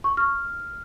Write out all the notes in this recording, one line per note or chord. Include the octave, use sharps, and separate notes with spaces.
C#6
F6